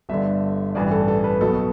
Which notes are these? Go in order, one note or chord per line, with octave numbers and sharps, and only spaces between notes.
G1 G2 D3 E5
A1 G2 E3 D5
A4
A4
B4
B1 B2 A4